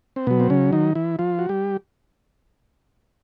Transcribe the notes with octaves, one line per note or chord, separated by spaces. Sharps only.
C4
B2 F#3 B3
C4
C#3 C#4
D#3 D#4
E3 E4
F3 F4
F#4
G3 G4